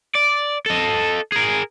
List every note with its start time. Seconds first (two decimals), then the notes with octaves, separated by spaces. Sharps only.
0.15 D5
0.66 A4 D#5
1.32 G#4 A#4